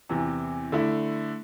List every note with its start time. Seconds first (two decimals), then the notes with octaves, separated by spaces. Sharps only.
0.09 E2 C3 E3
0.72 D3 A3 E4